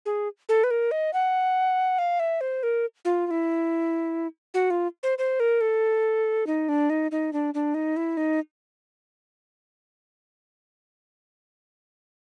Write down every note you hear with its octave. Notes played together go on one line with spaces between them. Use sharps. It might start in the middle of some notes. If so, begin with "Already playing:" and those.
G#4
A4
B4
A#4
D#5
F#5
F5
E5
C5
A#4
F4
F4
E4
F#4
F4
C5
C5
A#4
A4
D#4
D4
D#4
D#4
D4
D4
D#4
E4
D#4